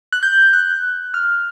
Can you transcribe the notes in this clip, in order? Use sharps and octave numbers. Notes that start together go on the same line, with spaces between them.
F#6
G6
F#6
F6